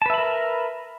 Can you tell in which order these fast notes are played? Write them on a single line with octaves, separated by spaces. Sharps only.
A5 B4 E5 B5 A#4